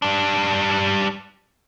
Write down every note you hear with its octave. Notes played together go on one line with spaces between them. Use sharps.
G3 D4